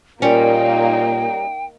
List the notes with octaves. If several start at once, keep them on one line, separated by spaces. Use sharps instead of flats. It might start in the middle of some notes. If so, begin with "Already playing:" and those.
A#2 G3 A#3 C#4 D#4 G5